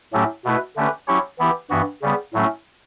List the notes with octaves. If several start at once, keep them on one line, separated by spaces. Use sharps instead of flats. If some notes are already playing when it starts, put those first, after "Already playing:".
A2 F#3 A3 C#4 G4
B2 A3 E4 B4
D3 A3 C#4 G4 B4
F#3 C#4 E4 G4 C#5
E3 B3 E4 G4
G2 E3 B3 F#4
C#3 G3 B3
A2 F#3 A3 C#4